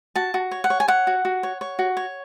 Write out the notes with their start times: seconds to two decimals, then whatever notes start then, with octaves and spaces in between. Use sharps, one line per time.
0.16 F#4 A5
0.34 F#4
0.51 C#5
0.64 F#5
0.70 C#5
0.80 G#5
0.88 C#5 F#5
1.07 F#4
1.25 F#4
1.43 C#5
1.61 C#5
1.79 F#4
1.97 C#5